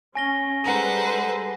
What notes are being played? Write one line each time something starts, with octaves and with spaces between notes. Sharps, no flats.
C#4 G#5 A#6 G7
G3 G#3 A4 B4 C5 F#5 A#5 D#7